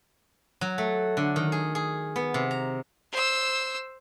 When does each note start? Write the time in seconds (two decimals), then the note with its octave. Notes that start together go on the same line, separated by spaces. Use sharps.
0.61 F#3
0.78 A3
1.17 D3
1.36 D#3
1.52 G#4
1.75 G#4
2.16 B3
2.34 C3
2.51 A#5
3.12 C5 E6